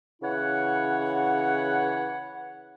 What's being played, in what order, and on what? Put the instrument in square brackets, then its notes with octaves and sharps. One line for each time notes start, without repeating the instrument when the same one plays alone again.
[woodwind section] C#3 E3 E4 C#5 F#5